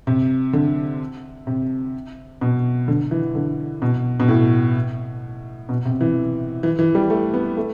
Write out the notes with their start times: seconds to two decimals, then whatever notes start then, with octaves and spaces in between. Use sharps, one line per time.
0.07 C3
0.53 D3
1.47 C3
2.41 B2
2.88 D3
3.11 E3
3.35 D3
3.82 B2
4.20 B2
4.28 A2
5.69 B2
5.85 C3
6.01 E3
6.63 E3
6.79 E3
6.95 G3
7.10 A3
7.34 B3
7.57 A3